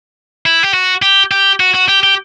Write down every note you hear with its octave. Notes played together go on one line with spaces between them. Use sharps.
E4
G4
F#4
G4
G4
F#4
F#4
G4
G4